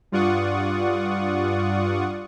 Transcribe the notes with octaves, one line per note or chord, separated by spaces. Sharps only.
G2 F4 D5 F#5 C#6 D#6